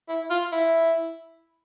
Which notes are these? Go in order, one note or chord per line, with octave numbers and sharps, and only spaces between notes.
E4
F4
E4